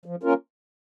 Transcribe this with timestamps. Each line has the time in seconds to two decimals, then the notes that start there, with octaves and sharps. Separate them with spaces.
0.06 F3
0.23 A#3 C#4 F4 A#4